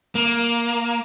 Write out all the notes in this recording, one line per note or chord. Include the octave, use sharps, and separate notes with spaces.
A#3